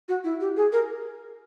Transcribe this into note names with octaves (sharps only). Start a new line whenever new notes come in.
F#4
E4
G4
G#4
A#4